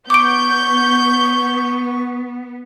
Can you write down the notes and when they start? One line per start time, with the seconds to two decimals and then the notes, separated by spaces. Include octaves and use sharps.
0.10 B3 C#6 D6 G6 D7